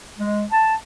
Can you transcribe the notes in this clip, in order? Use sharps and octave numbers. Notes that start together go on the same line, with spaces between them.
G#3
A5